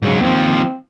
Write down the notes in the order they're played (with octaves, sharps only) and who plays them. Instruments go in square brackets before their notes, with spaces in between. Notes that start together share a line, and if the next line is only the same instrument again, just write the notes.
[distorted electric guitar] G#2 F#3 [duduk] C#3
[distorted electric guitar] D#2 F3 [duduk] C4